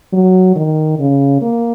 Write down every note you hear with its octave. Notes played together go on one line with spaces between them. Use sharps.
F#3
D#3
C#3
A#3